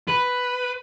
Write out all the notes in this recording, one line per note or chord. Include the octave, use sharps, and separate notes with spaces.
B4